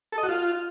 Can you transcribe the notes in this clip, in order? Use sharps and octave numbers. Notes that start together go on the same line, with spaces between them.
A4
D#5
F#4
F4